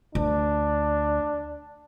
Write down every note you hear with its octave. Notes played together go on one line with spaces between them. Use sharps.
D2 D4